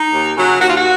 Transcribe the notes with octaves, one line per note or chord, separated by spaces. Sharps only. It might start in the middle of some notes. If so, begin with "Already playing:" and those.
Already playing: D#4
D#2
C#3 F#3
D#2 F#4
F4
F#4